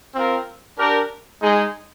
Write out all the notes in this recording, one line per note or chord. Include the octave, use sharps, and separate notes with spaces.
C4 F4 A#4
D4 G4 A#4
G#3 D#4 G#4